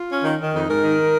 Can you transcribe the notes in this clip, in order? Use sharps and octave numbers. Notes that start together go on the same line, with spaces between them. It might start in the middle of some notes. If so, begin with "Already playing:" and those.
Already playing: F4
C#4
D#3
D#3
F2 D#4
G#2 A#4
D#3